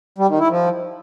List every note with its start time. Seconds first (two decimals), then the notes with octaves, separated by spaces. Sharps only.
0.18 G3
0.29 D#3
0.39 E4
0.50 F3